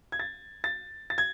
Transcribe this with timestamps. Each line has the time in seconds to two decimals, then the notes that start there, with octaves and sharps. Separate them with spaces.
0.12 G#6
0.20 A6
0.64 A6
1.10 A6
1.18 G#6